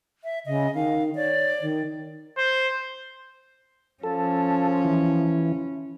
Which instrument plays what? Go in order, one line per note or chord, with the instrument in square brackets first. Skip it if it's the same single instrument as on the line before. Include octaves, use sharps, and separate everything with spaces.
[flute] E5
[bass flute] C#3 [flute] D#5
[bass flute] D#3 [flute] F5
[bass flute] C#5 [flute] D5
[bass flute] D#3
[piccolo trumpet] C5
[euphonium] F3 [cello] C#4 [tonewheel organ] A4
[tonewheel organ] E3